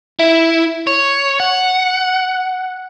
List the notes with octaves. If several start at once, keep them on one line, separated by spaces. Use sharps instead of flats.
E4
C#5
F#5